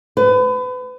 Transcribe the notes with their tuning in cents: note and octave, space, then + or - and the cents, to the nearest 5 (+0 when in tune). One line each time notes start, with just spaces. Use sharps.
B4 +35